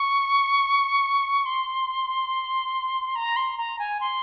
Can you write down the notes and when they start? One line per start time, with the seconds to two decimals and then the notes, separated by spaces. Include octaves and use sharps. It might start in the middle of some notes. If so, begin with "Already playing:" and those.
Already playing: C#6
1.46 C6
3.15 A#5
3.36 C6
3.58 A#5
3.79 G#5
4.00 C6